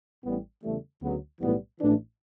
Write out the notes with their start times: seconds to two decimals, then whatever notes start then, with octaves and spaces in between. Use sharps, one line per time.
0.24 A1 A2 G3 B3
0.62 E2 C#3 E3 G3 A3
1.01 D2 C#3 F#3 B3
1.41 B1 A2 E3 G3 B3
1.79 A1 A2 E3 D4